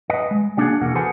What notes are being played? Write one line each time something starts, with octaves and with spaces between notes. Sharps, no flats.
B4 D#5
G#3
G3 A#3 D4 D#4 F#4 G#4
E2 B2 A#3 F#4 F#5
G#4 A4 B4 C5 F#5 G#5